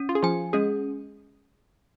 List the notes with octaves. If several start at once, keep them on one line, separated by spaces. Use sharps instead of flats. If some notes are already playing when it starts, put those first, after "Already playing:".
Already playing: C#4
F4
G#4
F3 F4 G#5
G#3 C#4 G#4